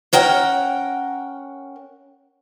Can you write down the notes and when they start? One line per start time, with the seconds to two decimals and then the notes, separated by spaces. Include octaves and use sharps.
0.13 C#4 A#4 F#5 G5